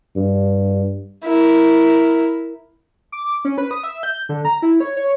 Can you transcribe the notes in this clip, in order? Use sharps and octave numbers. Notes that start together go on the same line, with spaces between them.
G2
E4 A#4
D6
C#4
B4
D#6
E5
G6
D3
A#5
E4
C#5
C#5